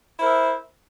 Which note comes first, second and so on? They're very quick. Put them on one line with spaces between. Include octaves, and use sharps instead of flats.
E4 C5 A#4 E5